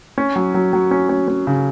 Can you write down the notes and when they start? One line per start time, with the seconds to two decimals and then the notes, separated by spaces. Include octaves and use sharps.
0.18 C#4
0.36 F#3
0.54 F#3
0.73 F#3
0.91 C#4
1.09 C#4
1.28 C#4
1.47 C#3